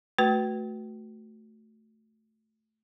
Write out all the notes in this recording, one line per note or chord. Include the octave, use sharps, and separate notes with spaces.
A3 F#4 B4